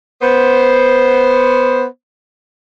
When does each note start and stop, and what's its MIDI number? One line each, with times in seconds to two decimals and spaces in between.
0.22 1.85 59
0.22 1.85 72